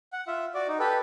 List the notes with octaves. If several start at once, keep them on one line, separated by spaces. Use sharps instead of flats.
F#5
F4 E5
F#4 D5
D#4
G4 A4 B4